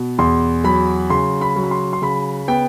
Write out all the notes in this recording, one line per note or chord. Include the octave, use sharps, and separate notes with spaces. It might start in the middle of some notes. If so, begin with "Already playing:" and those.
Already playing: B2
E2 C6
F#3 B5
C#3 C6
B5
F#3
B5
C6
C6
C#3 B5
B3 G5